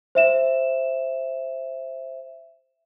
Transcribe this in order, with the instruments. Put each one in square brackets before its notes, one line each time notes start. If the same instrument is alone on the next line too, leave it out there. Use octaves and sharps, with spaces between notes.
[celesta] C5 E5 E7